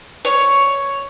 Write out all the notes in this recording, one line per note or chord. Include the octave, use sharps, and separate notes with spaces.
C#5